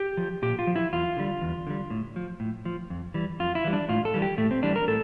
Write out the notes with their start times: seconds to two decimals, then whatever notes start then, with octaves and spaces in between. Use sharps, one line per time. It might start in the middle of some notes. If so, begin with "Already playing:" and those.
Already playing: G4
0.17 F3
0.42 A#2 G4
0.59 F4
0.67 F3
0.76 E4
0.93 E2 F4
1.17 D3 G3
1.42 E2
1.67 D3 G3
1.90 A2
2.16 F3
2.40 A2
2.65 F3
2.90 F2
3.14 E3 G3
3.39 F2 F4
3.55 E4
3.64 E3 G3
3.73 D4
3.89 A2 F4
4.05 A4
4.14 E3 G3
4.22 G4
4.38 A2 A3
4.51 C4
4.62 E3 G3 D4
4.76 A#4
4.88 A2 A4